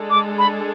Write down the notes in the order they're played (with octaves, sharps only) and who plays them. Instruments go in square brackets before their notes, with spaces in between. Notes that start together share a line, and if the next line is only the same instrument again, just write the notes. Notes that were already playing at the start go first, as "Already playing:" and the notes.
Already playing: [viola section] G#3 D4 A4
[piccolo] D6
B5